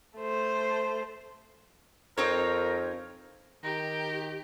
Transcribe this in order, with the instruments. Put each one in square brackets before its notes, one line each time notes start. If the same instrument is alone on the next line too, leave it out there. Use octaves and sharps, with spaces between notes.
[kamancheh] A3 C5
[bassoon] F2 [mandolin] C4 D#4 C#5 [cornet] A#4
[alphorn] D#3 [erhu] G4 [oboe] A#5